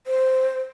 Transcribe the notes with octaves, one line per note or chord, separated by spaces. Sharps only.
C5